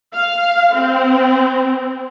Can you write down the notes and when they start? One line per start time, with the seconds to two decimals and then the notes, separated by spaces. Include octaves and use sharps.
0.14 F5
0.74 C4